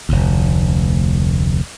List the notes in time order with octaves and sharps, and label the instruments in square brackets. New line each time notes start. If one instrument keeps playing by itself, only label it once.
[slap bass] F1 D2